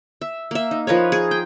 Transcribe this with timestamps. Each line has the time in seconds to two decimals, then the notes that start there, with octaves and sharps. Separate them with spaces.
0.21 E5
0.51 A#3 E5
0.71 D#4
0.87 F3 A#4 B4 C#5
1.12 G#4
1.31 G5